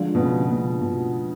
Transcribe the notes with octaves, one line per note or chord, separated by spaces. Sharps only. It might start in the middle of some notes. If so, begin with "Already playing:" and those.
Already playing: D3 F3 G#3 D4 F4
B2
C#3
B2
B2